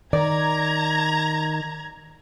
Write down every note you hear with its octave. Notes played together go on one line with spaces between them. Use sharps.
D#3 D5 A#5 G#6